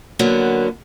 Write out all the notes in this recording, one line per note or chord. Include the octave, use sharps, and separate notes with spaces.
D3 F#3 A#3 B3